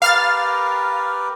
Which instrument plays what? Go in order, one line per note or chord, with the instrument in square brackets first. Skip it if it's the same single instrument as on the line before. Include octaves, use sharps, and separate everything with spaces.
[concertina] G4 A#4 B4 [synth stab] F5 F6 A6